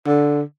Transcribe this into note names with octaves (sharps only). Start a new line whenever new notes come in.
D3